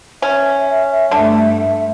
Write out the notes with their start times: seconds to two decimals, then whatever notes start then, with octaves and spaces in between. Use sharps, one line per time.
0.22 C#4 E5
1.11 G2 D3 A3